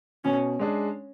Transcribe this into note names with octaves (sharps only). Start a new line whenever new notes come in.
B2 C#4
G#3 D4 G#4